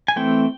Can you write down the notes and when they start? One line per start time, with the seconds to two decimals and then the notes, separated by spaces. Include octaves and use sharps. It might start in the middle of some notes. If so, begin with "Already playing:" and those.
0.08 G#5
0.16 E3 A3 C4 G5